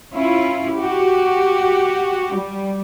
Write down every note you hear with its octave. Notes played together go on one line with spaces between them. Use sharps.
C#4 E4 F4
F#4 G4
G3